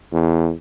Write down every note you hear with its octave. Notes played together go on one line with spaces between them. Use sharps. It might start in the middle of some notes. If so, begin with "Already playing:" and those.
E2